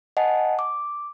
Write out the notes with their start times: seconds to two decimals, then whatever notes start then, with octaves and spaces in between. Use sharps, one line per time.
0.17 D#5 F#5 G#5 A5
0.59 D6